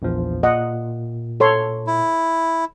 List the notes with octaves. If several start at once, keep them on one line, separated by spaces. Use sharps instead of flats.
A#1 E2 F3
A#2 D#5 F#5
A4 C#5 C6
E4